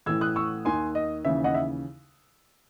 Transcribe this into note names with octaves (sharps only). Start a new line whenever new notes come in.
A1 A2 E3 E6 G#6
D#6 F#6
C#6 E6
D#2 D#3 G#5 C6
D#5
D#2 C#3 E3 E5
D#5 F#5
E5